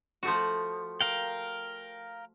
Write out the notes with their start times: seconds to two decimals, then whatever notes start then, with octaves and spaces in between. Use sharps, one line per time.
0.23 F3 A3 F#4
1.01 A#4 F5 G5